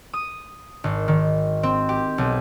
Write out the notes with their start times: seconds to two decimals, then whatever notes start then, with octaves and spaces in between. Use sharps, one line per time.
0.14 D#6
0.84 G#1
1.08 D#3
1.63 C4
1.89 G4
2.18 B1